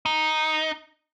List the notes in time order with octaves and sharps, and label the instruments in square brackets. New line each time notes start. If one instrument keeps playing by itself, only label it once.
[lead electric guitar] D#4